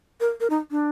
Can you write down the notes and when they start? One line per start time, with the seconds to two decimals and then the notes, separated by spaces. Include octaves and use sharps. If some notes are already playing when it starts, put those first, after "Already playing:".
0.20 A#4
0.40 A#4
0.50 D#4
0.71 D4